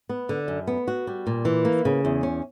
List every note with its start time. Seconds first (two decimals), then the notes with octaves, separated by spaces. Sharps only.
0.09 B3
0.29 D3
0.48 F#2
0.67 B3
0.88 F#4
1.07 G3
1.27 A#2
1.45 E3
1.65 A#3
1.85 C#3
2.05 E2
2.23 C#4